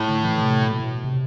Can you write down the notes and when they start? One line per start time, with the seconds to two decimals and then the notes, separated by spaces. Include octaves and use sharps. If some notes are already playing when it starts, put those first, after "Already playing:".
Already playing: A2
0.09 D3
0.24 E3
0.41 C3
0.62 B2
0.83 B2
1.04 C3